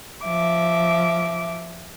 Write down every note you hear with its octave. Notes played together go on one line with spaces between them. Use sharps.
F3 E5 D6